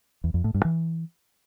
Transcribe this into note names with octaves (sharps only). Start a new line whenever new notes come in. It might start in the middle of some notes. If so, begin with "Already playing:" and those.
E2
F2
A2
G2
E3